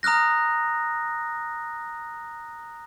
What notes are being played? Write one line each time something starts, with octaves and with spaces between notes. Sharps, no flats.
A#5 D#6 F6 F#6 A#6